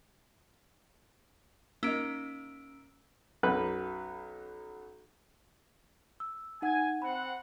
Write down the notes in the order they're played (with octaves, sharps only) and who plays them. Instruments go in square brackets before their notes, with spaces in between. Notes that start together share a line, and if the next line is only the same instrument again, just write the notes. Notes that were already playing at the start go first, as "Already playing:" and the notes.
[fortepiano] A#3 D#4 [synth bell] C#4 [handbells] E6 D7
[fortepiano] B1 F#2 B4 F#6
[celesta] E6
[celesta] D#4 F#5 [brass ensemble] G#5
[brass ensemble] C4 F#5 [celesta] B5